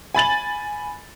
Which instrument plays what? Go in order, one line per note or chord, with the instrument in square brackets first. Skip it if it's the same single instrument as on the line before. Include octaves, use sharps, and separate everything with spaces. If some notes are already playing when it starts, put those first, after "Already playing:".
[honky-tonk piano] G#5 B5 A6 F#7